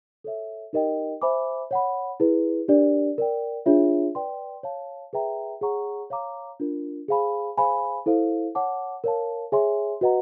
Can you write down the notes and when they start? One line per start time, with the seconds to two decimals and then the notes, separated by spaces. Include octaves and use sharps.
0.24 A4 C#5 E5
0.73 D#4 G4 A#4 D#5 G5
1.22 C5 E5 G#5 B5 D6
1.71 C#5 F#5 B5
2.20 E4 G#4 B4
2.68 D4 G4 A#4 D5
3.18 A#4 D5 G5
3.66 D4 F4 G#4 C#5 E5
4.15 B4 D5 G5 C6
4.63 C#5 F5 A5
5.13 G#4 B4 E5 G5 A#5
5.61 G#4 C#5 F#5 A#5 C#6
6.10 C#5 F5 A#5 D6
6.60 D4 F4 A#4
7.08 G#4 C5 F5 G#5 B5
7.58 G#4 C5 F5 G#5 B5
8.06 E4 A4 C5 F5
8.55 C#5 F#5 A5 D6
9.04 A#4 C#5 F5 A5
9.52 G#4 C#5 E5 G#5 C6
10.01 F#4 B4 D#5 F#5 A#5